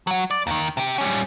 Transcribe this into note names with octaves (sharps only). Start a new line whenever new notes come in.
F#3 F#4
D5
D#2 D#3
C3 G4
G3 C#4